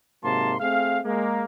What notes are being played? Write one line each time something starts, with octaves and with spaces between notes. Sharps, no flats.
G#2 C3 F#3 A#3 A5 C6
A3 C4 G#4 F5
G#3 A#3